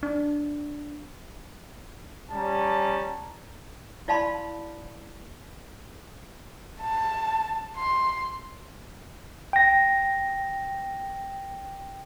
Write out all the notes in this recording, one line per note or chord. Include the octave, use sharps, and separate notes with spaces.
D4
G3 C#4 A5 A#5
E4 D5 F5 A5 B5 C6
A5
C6
G5 A#6